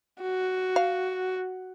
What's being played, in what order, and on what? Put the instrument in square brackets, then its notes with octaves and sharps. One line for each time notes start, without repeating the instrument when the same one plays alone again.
[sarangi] F#4
[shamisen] F5